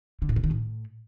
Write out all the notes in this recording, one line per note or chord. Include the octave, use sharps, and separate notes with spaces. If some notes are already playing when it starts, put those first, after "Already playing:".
D3
A2
C#3
D#3
A2